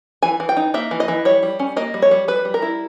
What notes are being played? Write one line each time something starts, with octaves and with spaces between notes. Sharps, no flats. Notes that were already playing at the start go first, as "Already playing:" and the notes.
E3 G#5
E3
G5
D#4
A#3 E5
E3
D#5
E3
G3 C#5
G3
C#4
A#3 D#5
G3
C#5
G3
G3 B4
G3
A#4
E4